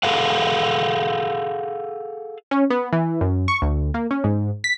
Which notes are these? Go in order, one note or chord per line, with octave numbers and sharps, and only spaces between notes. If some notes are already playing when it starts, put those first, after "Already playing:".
G#4 A4 F5 F#5
C#4
B3
E3
F#2
C#6
D2
A#3
C#4
G#2
B6